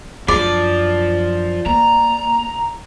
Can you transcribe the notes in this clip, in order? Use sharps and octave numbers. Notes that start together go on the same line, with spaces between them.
F#2 F3 D4 D5
A#3 A#5